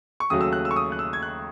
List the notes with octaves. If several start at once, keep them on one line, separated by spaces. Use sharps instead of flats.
C#6
D#2 C#3 F#3 A3 D#6
E6
F#6
E6
C#6
D#6
F#6
E6
G#6
F#6